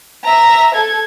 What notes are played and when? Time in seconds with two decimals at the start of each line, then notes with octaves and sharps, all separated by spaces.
0.24 E5 A#5
0.75 A4 G#6